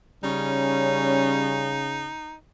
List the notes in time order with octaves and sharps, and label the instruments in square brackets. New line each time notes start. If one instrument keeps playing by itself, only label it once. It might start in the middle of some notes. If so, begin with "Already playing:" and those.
[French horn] C#3 [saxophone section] G3 C#4 [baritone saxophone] D#4